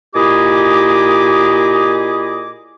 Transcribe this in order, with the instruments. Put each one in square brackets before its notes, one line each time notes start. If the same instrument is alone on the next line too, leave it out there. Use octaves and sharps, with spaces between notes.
[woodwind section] A#2 E4 G4 G#4 D#5 D6